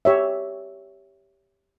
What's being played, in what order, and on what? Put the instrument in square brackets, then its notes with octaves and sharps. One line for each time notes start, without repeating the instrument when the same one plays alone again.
[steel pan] G4 C#5 E5